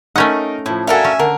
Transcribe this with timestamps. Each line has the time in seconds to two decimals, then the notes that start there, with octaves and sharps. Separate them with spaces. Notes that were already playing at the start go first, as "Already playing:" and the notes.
0.16 A3 C#4 D#4 A#4 F#5
0.66 A2 F3 E4
0.87 D4 F#4 A4 A#4 E5 F5 G#5
1.04 C#4
1.19 D3 A#4